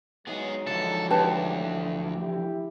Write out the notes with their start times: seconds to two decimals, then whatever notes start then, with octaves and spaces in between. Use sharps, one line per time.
0.27 F#3 G#3 B3 D#4 G#4
0.67 D3 E3 F3 A4
1.10 D2 G4 B4 A5
2.20 E4 G4